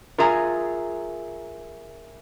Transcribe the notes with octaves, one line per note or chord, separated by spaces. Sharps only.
F4 G#4 A#4 E5 G#5 A#5